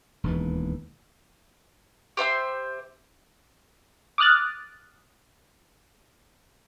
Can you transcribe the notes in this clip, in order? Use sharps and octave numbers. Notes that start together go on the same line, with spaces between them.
E1 D#2 E3
G4 C5 E5 C6
D6 D#6 F6 F#6 A6